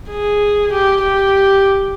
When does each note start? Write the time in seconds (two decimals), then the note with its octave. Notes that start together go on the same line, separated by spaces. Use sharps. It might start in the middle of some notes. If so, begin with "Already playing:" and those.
0.10 G#4
0.72 G4
1.02 G4